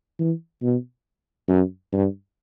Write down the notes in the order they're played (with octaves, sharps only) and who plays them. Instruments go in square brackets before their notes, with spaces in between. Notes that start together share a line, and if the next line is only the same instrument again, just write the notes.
[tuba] E3
B2
F#2
G2